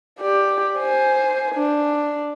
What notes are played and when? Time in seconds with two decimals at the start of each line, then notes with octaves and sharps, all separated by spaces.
0.19 G4 D5
0.78 C5 G#5
1.55 D4